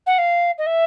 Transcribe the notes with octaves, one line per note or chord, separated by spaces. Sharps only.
F#5
F5
D#5
E5